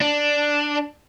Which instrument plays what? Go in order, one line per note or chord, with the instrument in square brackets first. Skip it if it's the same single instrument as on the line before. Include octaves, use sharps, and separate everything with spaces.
[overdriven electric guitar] D4